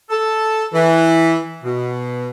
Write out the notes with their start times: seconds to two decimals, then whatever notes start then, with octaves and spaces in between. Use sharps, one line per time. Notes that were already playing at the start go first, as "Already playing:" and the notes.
0.10 A4
0.74 E3
1.64 B2